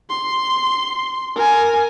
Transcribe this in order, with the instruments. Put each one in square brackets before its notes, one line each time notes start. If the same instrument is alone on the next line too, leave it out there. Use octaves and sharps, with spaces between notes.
[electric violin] C6
A#4 G#5